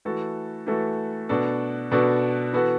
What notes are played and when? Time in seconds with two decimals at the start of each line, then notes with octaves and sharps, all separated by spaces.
0.05 E3 A3 F#4 A4
0.67 E3 A3 F#4 A4
1.29 B2 B3 D4 F#4 A4
1.91 B2 B3 D4 F#4 A4
2.53 E3 B3 F#4 A4